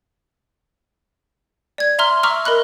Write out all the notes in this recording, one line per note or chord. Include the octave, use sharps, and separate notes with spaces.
D5 G#6
E5 A#5 C6 F6
E5 A#5 C#6 D6 E6 F6
A#4 D#5 B5 F#6